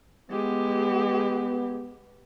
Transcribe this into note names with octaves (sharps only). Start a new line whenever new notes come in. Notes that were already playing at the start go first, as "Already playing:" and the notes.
G#3 B3 G4